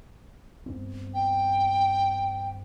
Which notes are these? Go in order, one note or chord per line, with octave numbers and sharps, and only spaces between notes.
G2 B3 C4
G5